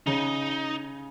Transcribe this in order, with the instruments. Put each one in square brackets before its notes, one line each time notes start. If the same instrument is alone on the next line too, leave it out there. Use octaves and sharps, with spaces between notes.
[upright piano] C#3 [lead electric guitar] D#4